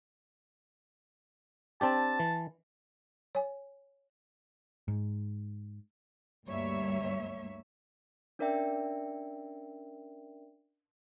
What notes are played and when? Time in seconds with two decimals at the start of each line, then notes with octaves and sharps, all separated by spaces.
1.81 C4 D4 G4 A5
2.20 E3
3.35 C#5 G#5
4.88 G#2
6.46 D2 G2 G3 A#3 C#5 E5
8.39 C#4 D4 A#4 D5 E5 G5